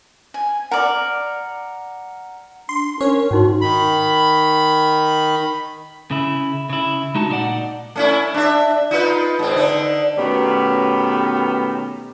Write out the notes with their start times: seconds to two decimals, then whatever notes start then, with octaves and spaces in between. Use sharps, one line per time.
0.34 G#5
0.71 A#4 D5 F#5 A#5
2.69 D4 C6
3.01 C#4 A#4 C5 C#5
3.31 G#2 C#4 D#4 F#4 C6
3.61 D#3 B5
6.11 C#3 E4
6.70 C#3 E4
7.15 G#3 D#4 F#4 A5
7.29 A#2 D#4 G4 D5 F#5
7.96 A3 C#4 E4
8.34 D4 E5
8.91 D#4 F4 B4
9.39 G#2 C4
9.56 D3 D#4
10.18 B2 D#3 A3 B3 C#4 G4